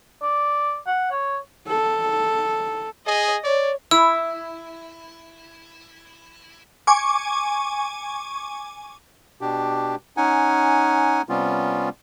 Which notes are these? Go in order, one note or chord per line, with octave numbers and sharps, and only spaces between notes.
D5
F#5
C#5
A4
G#4 D#5
C#5 D5
E4 E6
G#5 C#6 D6
B2 D4 G4
C#4 D#4 F#5 G#5
C3 G3 B3 C#4 F4